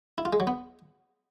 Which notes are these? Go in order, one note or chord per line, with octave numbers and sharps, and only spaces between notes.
E4
F4
G#3
F#3
B3